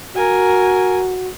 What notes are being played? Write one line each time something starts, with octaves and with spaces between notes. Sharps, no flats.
F#4 A#4 G#5